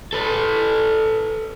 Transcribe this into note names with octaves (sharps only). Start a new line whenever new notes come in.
A4 B4